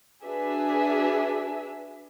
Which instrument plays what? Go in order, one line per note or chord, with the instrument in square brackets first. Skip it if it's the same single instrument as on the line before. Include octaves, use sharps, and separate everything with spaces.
[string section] D4 F#4 G#4 B4 E5